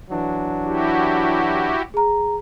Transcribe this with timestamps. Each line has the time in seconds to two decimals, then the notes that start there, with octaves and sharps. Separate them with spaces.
0.11 E3 F#3 D4
0.64 E4 F#4 G4
1.94 G#4 A#5